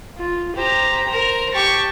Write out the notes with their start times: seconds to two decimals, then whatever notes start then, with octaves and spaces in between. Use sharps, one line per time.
0.17 F4
0.56 G4 C5 A#5
1.09 A#4 C5 A#5
1.54 G4 A5 C#6